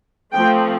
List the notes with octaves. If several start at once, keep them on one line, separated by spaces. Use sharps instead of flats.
F3 A3 C4 G5